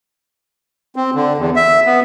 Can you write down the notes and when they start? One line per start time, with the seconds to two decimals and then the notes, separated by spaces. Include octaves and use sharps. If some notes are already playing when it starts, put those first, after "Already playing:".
0.96 C4
1.15 D3
1.37 E2
1.56 E5
1.85 B3